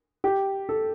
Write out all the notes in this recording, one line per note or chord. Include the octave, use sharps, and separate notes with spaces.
G4
A4